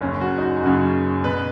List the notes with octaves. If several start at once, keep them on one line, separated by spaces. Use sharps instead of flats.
F#1 F#2 C#3 C#4
F#4
D#4
F#4
F#1 F#2 C#3 F#4
B2 B4